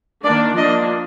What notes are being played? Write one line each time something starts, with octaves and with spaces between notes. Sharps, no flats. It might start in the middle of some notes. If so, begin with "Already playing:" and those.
D#3 A#3 D4 D5
F3 A#3 D4 D#5